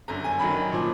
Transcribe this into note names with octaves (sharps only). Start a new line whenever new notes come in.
G1 F#2 D3 A#5
G#5
F#2 D#3 F#3 B5
A#2 F3